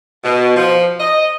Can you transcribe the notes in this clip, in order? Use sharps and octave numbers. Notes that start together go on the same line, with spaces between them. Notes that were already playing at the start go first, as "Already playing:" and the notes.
B2
F3
D#5